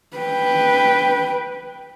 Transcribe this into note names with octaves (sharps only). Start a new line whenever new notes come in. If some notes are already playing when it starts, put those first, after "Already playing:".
B4 G5